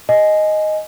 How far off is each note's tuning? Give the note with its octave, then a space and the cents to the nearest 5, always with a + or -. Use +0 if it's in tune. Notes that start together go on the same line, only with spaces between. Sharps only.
D#5 +0 G#5 +15